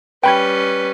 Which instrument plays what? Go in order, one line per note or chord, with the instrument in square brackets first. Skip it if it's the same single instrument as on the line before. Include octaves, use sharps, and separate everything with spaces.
[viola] G3 C#4 [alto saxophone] B4 [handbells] G5 B5 G#6